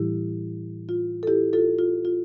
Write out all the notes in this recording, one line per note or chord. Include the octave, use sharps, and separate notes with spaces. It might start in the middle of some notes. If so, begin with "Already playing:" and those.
Already playing: A2 E3 G3 E4 G4
F4
A4
E4 G4
F4 A4
F4
F4